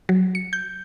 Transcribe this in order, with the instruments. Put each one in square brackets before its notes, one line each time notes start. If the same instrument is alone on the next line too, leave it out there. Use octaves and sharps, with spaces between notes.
[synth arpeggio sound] F#3
C#7
G6